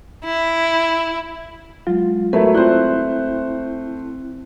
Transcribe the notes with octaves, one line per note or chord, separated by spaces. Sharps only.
E4
F#3 G#3 F4
F#3 A3 E4 A#4 B4
C4 E4 F4 C5 D5 F#6